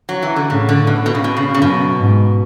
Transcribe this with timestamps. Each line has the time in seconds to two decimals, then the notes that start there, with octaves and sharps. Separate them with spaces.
0.09 F#3
0.23 E3
0.36 D3
0.50 A2 C#3
0.69 D3
0.87 B2
1.06 B2
1.15 C#3
1.24 B2
1.37 C#3
1.54 C#3
1.61 F#2 B2
1.99 G#2